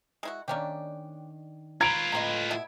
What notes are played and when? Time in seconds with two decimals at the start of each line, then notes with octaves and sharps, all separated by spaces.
0.23 G#3 E4 F#4
0.48 D#3 A#3 C#4 D4 G4
1.81 F4 B4 A#5 G#6 D7 F7
2.12 A2 D#5 A#5 C6
2.51 B2 E4